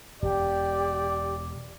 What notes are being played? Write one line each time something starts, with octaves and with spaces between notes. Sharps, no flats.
E1 G4 D5